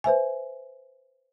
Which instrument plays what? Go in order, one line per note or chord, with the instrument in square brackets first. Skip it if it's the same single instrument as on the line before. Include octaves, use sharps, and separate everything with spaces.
[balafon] B4 C5 E5 G#5